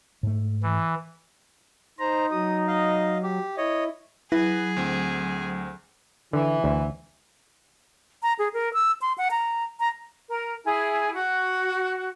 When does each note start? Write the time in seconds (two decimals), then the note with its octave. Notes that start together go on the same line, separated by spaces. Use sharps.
0.23 G#2 A3
0.63 E3
1.99 D#4 C5 A#5
2.31 F#3 D#6
2.67 D#5 F5
3.23 G4
3.57 E4 C#5 D#5
4.32 F#3 E4 G#4 B4
4.76 D2 C4
6.33 D3 E3
6.64 D2
8.23 A#5
8.39 G#4
8.54 A#4
8.74 E6
9.02 C6
9.18 F#5
9.31 A#5
9.80 A#5
10.29 A#4
10.65 E4 G#4
11.13 F#4